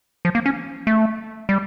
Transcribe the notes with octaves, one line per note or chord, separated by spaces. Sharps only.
F3
A#3
C#4
A3
G3